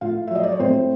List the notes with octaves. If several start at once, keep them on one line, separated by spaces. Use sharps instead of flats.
A2 F4 F5
E5
F#3 D#5
D5
C#5
A2 C4 C5